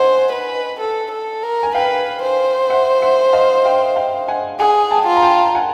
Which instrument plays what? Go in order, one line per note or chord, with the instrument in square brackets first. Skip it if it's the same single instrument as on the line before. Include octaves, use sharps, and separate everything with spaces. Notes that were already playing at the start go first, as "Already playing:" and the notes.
Already playing: [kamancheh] C5 [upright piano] D#5 F#5 G#5
[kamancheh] B4
A4
A4
A#4
[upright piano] G#5
[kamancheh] B4 [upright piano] F5 G5
[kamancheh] C5
[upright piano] E5 F#5
E5 F#5
D#5 F5
F5 G5
F5 G5
F#5 G#5
[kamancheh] G#4 [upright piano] F#5 G#5
[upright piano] G5 A5
[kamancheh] F4
[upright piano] A#5
G5 A5
F#5 G#5